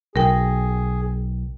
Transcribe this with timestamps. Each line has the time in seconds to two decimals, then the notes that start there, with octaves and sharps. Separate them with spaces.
0.16 B1 G#4 A#4 G5